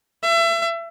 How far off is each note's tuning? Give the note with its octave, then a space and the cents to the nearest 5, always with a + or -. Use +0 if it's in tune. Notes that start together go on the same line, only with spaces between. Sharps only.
E5 +30